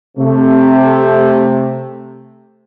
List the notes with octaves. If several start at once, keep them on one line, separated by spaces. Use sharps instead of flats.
C3 A3